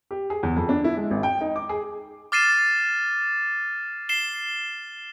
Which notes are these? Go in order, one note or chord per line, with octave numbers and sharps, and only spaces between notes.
G4
G#4
E2
F2
D4
E4
G#3
G#1
G5
D#4
D6
G#4
D6 F6 A6 C7 D#7 E7
C7 E7 G7